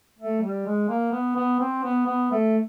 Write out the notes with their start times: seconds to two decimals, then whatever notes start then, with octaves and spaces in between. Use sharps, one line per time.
0.19 A3
0.41 G3
0.66 G#3
0.89 A#3
1.12 B3
1.36 B3
1.60 C4
1.83 B3
2.06 B3
2.31 A3